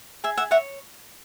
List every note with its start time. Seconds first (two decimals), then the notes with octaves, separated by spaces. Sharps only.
0.24 G#4 E5
0.37 E5 F#5
0.51 C#5 E5 F#5